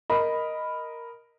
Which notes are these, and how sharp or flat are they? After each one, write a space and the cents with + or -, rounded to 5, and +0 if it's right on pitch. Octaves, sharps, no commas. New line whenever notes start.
A#4 +0 D#5 +0 B5 +0